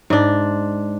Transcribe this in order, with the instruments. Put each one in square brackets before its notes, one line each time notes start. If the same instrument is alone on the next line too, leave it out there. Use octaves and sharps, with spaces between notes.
[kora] G#2 D4